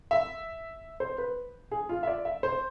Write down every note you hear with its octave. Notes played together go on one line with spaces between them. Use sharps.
E5
C5
B4
G#4
F4
E5
D5
E5
C5